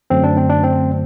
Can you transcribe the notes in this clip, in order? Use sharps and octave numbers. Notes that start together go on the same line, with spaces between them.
F#2 D3 F#3 A3 C4
D4
C4
D4
C4